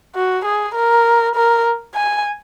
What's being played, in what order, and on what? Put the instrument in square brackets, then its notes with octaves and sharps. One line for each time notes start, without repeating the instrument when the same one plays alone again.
[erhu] F#4
G#4
A#4
A#4
G#5